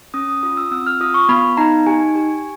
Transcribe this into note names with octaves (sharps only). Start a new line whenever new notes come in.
C#4 D#6
D#6
F4 D#6
E6
C4 E6
F6
F4 D#6
C#6
B3 B5
D#4 A#5
G4 G#5
G4